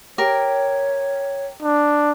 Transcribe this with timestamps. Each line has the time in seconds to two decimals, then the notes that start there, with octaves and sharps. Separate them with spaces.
0.18 G4 A#4 C#5
1.62 D4